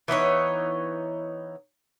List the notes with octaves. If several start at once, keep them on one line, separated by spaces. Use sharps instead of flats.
E3 B3 D#4 C#5